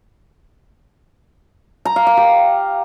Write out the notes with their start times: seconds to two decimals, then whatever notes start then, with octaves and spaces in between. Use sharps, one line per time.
1.85 A#5
1.96 F5
2.07 F5
2.17 G4